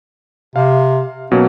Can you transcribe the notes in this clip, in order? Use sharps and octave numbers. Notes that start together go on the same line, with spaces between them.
C3 F5
B2 F#3 A#3 C#4